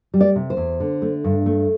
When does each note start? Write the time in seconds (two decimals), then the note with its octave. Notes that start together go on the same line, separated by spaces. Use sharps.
0.14 G3
0.21 D5
0.36 C3
0.50 C5
0.57 E2
0.80 D3
1.02 A3
1.24 G2
1.46 A3